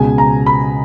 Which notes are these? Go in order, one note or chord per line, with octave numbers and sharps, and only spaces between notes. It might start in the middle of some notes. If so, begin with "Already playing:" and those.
Already playing: C#2 B2 G#3 G#5
A#5
B5